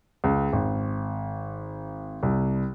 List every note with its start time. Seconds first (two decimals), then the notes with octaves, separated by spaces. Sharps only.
0.24 C#2
0.53 G#1
2.23 C2